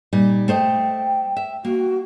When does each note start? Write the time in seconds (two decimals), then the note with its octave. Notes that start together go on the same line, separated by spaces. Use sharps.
0.13 A#2 G3 D#4
0.48 A3 C5 D#5 G5
1.37 E5
1.65 A#3 F#4